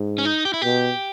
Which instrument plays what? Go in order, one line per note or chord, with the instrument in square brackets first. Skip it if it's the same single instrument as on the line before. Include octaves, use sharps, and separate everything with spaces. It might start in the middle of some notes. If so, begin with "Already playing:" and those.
Already playing: [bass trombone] G#2
[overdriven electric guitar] C#4
D#4
G4
E4
[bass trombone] B2 [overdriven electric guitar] G4